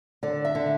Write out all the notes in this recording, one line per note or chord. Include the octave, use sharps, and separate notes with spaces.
D3 D5
E5
D3